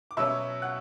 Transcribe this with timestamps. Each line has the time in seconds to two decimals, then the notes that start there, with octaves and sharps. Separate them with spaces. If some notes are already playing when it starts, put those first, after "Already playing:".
0.11 D6
0.17 B2 F#3 C#4 E5 E6
0.62 F#5 F#6